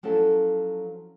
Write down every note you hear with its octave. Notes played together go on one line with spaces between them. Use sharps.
F3 F#3 C#4 E4 A4